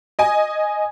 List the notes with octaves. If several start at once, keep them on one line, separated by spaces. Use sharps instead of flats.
D#5 G#5